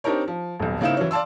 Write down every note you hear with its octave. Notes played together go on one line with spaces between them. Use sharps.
C4 D4 D#4 G4 A#4 C#5
F3
D#1 B1
C#3 A#3 C4 D#4 E4 E7
E3 F#3 C#4
D5 F5 A5 C6 E6